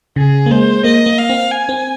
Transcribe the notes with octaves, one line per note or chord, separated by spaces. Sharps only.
C#3 G#4
A#3
G#3 C5
A#3 D#5
A#3
F5
C4
G#5
C4